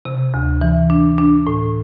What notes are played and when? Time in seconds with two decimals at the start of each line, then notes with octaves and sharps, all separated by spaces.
0.05 C3
0.34 D2
0.61 E3
0.90 D4
1.18 D4
1.47 A2